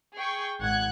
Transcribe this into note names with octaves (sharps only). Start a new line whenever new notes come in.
G#4 G5 C#6
G#1 F#5 F#6 G#6